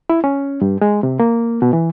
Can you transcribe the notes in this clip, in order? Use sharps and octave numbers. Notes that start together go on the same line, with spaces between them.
E4
C#4
G2
G#3
C3
A#3
B2
E3